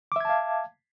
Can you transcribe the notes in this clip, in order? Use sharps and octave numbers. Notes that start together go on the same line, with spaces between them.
E5 F5 A5 D6 G#6